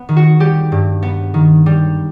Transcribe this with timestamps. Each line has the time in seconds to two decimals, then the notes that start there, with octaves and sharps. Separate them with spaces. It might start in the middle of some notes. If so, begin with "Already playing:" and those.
Already playing: B3
0.09 D#3
0.17 F#4
0.40 G3 G4
0.72 G2
1.03 B3
1.34 D#3
1.66 G3